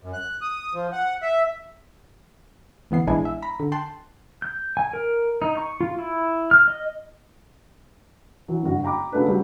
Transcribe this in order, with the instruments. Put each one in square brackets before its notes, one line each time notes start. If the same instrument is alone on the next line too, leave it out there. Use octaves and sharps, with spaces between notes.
[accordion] F#2
F#6
D#6
F3
F#5
E5
[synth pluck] D2 E3 B3 C7
A#1 E3 G#3 D4 E4 G#5
E5
A#5 B5
D3
G5 A5 C6 F#6
[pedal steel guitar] G6
G#5
A#4
D#4
C#6
F4
E4
F6
D#5
[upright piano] E3 F#3
F#1 G2 F#4
G5 A#5 B5 D6
C#3 F#3 A3 D4 B4
F#3 G3 G4